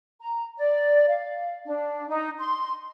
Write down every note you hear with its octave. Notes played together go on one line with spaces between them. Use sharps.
A#5
D5
F5
D4
D#4
C6